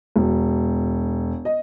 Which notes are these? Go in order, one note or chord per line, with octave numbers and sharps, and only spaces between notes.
E1
D#5